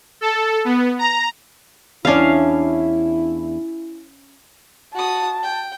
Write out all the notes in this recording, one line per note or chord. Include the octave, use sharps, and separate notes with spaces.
A4
B3
A#5
E2 C#4 D4 E4 F5
F#4 A5 D#6
G5